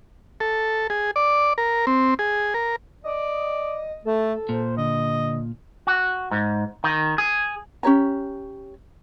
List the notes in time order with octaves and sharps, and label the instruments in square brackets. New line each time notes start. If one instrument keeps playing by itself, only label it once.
[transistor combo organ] A4
G#4
D5
A#4
C4
G#4
A#4
[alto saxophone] D5 [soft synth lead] D#5
[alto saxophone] A3 [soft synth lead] A4
[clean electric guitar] A#2 [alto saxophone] C5
[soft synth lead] D3 [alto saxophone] D#5
[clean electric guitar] F#4
G#2
D#3
G#4
[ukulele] C#4 G4 C#5 A#5